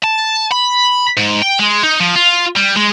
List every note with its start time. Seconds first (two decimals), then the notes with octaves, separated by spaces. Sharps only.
0.04 A5
0.52 B5
1.17 G#2
1.42 G5
1.59 G#3
1.83 D#4
2.00 F3
2.15 F4
2.55 G3
2.76 G#3